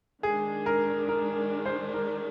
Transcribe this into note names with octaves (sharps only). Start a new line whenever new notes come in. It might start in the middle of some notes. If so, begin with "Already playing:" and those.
D#3 G#3 D4 G#4
A#4
A#4
C5
A#4